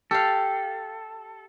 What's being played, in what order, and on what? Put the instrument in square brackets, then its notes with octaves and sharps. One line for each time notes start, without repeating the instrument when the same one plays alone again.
[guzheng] G4 F5 [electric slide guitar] A4